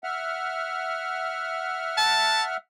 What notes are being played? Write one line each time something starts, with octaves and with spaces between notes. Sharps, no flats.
E5 F#5 F6
A5